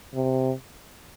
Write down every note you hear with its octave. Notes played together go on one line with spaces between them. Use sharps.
C3